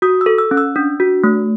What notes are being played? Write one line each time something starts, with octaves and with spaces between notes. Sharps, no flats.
F#4 D#6
E6
A4
E6
C#4
E6
D4
F#4
A3